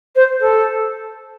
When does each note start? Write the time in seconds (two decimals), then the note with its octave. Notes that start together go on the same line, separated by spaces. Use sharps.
0.15 C5
0.40 A4